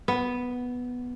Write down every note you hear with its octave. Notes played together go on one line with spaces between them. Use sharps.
B3